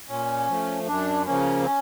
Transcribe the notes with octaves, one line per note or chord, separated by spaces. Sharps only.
A#2 C#4
F3 A3
F#2 D4
C#3 F3 A#3 C#4
C4
C#4